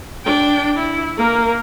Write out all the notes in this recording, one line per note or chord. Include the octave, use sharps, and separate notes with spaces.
D4 G5
E4
A#3 A#4